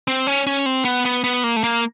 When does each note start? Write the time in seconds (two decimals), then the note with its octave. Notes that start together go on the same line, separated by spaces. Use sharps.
0.08 C4
0.27 C#4
0.47 C#4
0.66 C4
0.85 B3
1.05 B3
1.24 B3
1.44 A#3
1.56 A3
1.64 A#3